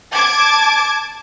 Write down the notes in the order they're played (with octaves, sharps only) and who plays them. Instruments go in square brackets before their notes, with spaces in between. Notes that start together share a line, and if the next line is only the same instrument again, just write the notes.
[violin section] A5 D6 G#6